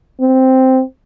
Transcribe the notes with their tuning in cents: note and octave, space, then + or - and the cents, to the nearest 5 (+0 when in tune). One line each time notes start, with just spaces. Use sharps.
C4 -5